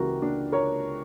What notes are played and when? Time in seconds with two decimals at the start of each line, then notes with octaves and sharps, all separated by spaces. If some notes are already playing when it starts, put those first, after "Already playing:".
Already playing: C#2 C#3 E3 F#4 G4 A#4
0.22 D4
0.52 A#4 C#5